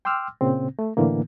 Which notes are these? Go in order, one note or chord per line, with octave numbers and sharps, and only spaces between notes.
G5 C6 D6 E6 F6
A#2 C#3 C4
A3
A2 D3 E3 A#3